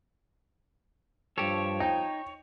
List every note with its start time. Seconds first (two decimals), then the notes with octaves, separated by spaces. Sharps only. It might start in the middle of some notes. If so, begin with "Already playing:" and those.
1.38 G2 F3 G4 A4 C#5
1.80 D#4 G5